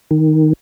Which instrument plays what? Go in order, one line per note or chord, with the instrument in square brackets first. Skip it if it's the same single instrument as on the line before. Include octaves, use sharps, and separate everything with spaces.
[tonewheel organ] D#3